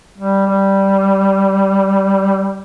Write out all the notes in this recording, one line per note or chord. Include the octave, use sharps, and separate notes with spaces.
G3
G3